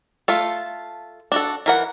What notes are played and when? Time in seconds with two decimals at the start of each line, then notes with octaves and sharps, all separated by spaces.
0.28 A3 F4 A4
1.32 D4 F#4 A4
1.66 E3 A#4 F#5